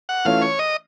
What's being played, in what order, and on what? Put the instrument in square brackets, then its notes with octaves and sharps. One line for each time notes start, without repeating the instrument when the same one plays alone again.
[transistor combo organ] F#5
[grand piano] E3 A3 C#4 F4 [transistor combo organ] F5
[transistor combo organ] C#5
D#5